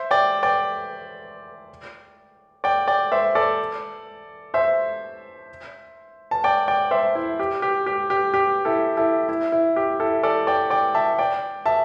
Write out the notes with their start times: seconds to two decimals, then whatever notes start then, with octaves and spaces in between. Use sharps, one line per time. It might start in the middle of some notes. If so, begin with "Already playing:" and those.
Already playing: C5 E5
0.11 D5 G5
0.43 D5 G5
2.64 D5 G5
2.88 D5 G5
3.12 C5 E5
3.35 A4 D5
4.54 C5 E5
6.31 A5
6.44 D5 G5
6.68 D5 G5
6.91 C5 E5
7.15 E4
7.39 G4
7.62 G4
7.86 G4
8.10 G4
8.34 G4
8.65 E4 A4
8.97 E4 A4
9.29 E4
9.52 E4
9.76 G4
10.00 E4 A4
10.23 A4 D5
10.47 D5 G5
10.70 D5 G5
10.95 E5 A5
11.19 D5 G5
11.66 E5 A5